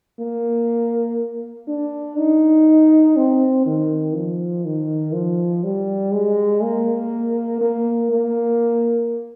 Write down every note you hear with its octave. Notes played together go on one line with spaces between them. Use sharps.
A#3
D4
D#4
C4
D#3
F3
D#3
F3
G3
G#3
A#3
A#3
A#3